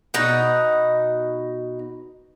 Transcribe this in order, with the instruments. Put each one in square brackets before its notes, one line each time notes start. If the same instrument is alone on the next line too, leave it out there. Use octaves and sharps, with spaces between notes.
[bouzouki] B2 D#4 F#5